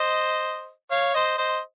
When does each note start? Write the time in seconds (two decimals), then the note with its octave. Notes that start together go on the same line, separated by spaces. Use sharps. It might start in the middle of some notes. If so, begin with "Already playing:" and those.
Already playing: C5 D#5
0.91 C#5 F5
1.14 C5 D#5
1.38 C5 D#5